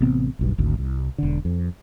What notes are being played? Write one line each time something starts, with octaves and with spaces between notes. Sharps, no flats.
A1 C3 B3 C4
F#1 B1 G2
G#1 D2
C2
E1 D3
F2